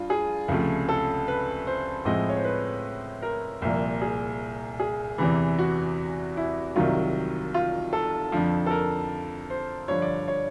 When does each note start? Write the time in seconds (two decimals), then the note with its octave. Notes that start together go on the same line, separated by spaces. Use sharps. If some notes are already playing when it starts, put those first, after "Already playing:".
Already playing: G2 F4
0.10 G#4
0.48 C#2 C3 F3 A3
0.89 A4
1.28 B4
1.67 C5
2.05 A2 F3 G#3 C4 D#5
2.29 C#5
2.37 C5
2.45 B4
3.22 A#4
3.62 C2 A#2 F3 A#3
4.02 G#4
4.80 G#4
5.18 E2 C3 E3
5.59 F#4
6.37 E4
6.76 C2 C3 D#3 F#3 F4
7.54 F4
7.93 A4
8.32 F2 D3 F3
8.66 A4
8.71 A#4
9.50 C5
9.88 G2 D3 F3 C#5
10.02 D5
10.28 C#5